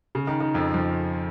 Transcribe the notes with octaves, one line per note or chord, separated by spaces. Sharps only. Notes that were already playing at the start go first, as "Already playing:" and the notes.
C#3
D#3
D#3
F2 F3
F2 F3